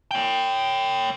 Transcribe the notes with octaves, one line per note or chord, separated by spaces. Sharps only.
C#5 G5